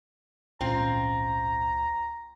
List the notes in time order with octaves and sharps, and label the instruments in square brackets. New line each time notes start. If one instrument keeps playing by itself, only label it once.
[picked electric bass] G#1 A#2 C#4 [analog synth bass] C#2 [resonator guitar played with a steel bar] C4 F4 [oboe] A#5